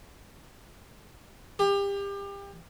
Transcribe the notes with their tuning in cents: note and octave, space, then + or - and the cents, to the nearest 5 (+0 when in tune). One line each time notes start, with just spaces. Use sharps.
G4 +30